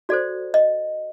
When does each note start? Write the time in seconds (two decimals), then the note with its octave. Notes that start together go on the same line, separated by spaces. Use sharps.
0.09 F#4 A4 C5 D5
0.54 D#5